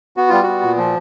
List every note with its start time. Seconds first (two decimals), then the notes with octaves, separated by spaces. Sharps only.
0.17 B3 F#4
0.30 G3 F4
0.43 B3 F#4
0.63 A#2
0.78 F3